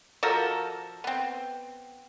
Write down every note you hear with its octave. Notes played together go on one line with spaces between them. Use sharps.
F3 F#4 A4 A#4
B3 C4